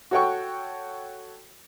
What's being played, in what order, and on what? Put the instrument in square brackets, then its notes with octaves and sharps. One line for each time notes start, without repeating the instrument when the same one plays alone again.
[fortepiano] F#4 A4 C#5 F#5 G5 C#6